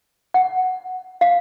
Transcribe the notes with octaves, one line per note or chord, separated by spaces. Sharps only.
F#5
F5